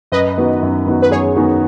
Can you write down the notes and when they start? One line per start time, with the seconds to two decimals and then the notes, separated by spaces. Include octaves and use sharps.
0.12 F#2 B4 D#5
0.37 D#3 B3 D#4 F#4
0.62 F#2
0.87 D#3 B3 D#4 F#4
1.02 B4
1.11 F#2 G#4 C#5
1.36 D#3 B3 D#4 F#4